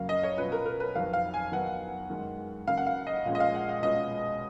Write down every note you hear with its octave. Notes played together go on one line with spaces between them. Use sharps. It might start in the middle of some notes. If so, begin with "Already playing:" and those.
Already playing: F#2 C#3 F#3 A#3 F5
D#5
C#5
B2 F#3 C#4 F4 B4
A#4
A#4
B4
F2 D#3 F#3 F5
F5
G#5
D#3 F#3 B3 D#4 F#5
F#2 D#3 G#3
C#3 F#3 A#3 F5
F#5
F5
D#5
A#2 F3 G#3 C#4 F5
D#5
F5
F#5
F5
B2 G#3 C#4 F4 D#5